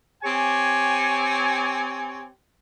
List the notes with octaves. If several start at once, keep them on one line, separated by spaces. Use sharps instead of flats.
C4 G4 C#5 G#5